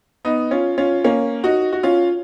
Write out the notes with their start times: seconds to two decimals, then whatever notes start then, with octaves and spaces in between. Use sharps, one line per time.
0.25 B3 D#4
0.51 C#4 F4
0.78 C#4 F4
1.04 A#3 C#4
1.43 D#4 F#4
1.73 F#4
1.83 C#4 F4